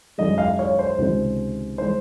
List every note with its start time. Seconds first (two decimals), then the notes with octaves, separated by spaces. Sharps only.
0.18 F#2 D#3 G#3 D#5
0.38 F5
0.59 C#5
0.79 C5
0.98 C#2 C3 D#3 C5
1.78 D#3 G#3 C5